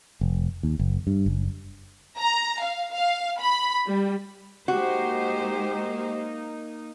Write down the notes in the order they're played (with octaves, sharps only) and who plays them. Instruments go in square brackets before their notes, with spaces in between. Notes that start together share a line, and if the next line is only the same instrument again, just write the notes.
[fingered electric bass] F1
D#2
F#1
G2
F#1
[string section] A#5
F5
F5
B5
G3
[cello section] G#3 C5 [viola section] A#3 D#4 [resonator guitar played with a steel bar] F#4 [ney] G4